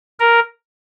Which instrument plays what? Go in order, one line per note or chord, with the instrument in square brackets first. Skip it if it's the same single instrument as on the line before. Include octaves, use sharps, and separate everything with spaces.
[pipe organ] A#4